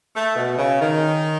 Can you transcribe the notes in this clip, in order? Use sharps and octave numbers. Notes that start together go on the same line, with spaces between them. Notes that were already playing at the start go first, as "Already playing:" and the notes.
A3
B2
C#3
D#3